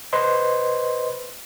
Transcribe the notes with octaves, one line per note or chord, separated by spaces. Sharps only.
B4 C5 D#5 C6